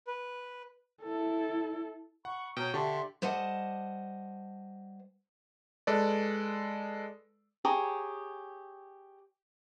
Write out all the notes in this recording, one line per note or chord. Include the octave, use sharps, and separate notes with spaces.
B4
E4 A4
F#5 B5 C#6
B2 C#5 G5 A#5 G6
D3 G4 E5 A5 C6 C#6
G3 C5 D#5 F#5 A5
G#3 A4 B4 D5
G4 G#4 C#5 A#5